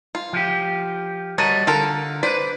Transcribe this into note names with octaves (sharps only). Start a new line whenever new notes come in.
F4
F3 G4
G3 F#4 A#4 C#5 D#5 A5
D3 F4 A4 A#4
B4 C5 D5